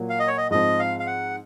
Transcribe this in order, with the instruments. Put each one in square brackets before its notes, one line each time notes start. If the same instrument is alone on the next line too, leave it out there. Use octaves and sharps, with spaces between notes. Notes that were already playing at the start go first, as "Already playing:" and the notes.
Already playing: [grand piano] A#2 F#3 A#3
[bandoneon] F5
D#5
C#5
D#5
[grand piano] G#2 F3 C4 [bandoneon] D#5
[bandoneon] F5
F5
F#5